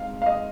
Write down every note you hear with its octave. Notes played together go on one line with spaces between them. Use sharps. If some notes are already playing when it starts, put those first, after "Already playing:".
Already playing: G#2 C4 F5
F5
D#5